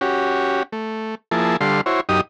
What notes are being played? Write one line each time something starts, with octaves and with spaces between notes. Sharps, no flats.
C#4 F#4 G4
A3
F3 A#3 E4 G#4 A5
D3 G3 A4 F5 C6
E4 F#4 C5 C#5
F#2 D#4 G4 D#6